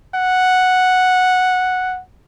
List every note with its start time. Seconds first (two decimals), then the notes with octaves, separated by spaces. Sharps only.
0.15 F#5